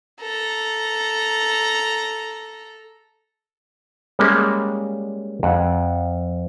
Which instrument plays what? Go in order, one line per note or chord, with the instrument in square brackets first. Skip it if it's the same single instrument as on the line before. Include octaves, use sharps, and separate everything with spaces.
[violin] A4 A#5
[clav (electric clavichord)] G3 G#3 A#3 C#4
F2 F#5